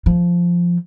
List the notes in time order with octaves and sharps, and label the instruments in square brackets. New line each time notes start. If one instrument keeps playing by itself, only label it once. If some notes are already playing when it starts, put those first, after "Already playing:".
[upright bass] F3